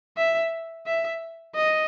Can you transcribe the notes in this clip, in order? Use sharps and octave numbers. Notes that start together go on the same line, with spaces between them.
E5
E5
D#5